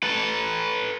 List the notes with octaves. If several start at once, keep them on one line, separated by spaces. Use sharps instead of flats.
A4 B4